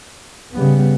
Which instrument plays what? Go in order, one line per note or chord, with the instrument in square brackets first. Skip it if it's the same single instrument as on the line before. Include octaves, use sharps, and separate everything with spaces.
[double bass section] C#3 G3 B3